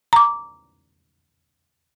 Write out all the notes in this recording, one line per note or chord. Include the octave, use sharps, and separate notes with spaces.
A#5 D6